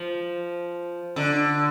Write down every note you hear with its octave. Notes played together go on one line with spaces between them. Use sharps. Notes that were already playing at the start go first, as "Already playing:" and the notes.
Already playing: F3
D3